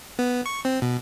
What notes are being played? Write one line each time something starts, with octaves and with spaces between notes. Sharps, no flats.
B3
C#6
C4
B2